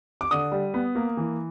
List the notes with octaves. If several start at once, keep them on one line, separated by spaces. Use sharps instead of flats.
D6
D3 D#6
G3
B3
A#3
E3